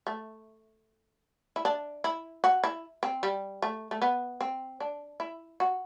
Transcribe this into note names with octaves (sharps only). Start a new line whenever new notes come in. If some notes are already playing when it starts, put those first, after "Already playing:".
A3
E4
D4
E4
F#4
E4
C4
G3
A3
A3
B3
C4
D4
E4
F#4